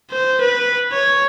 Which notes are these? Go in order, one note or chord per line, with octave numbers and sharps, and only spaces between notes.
C5
B4
C#5